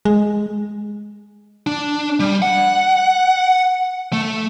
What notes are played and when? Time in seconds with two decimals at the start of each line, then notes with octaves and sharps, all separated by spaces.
0.05 G#3
1.67 D4
2.20 G3
2.42 F#5
4.13 A3